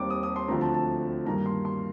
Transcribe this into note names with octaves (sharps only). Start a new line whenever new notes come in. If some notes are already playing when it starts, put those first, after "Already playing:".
Already playing: D#2 D#3 G3 C4 D6
D#6
D#6
C6
D2 D3 F3 A3 C4 A#5
A5
A5
G2 D#3 A#3 A#5
C6
C6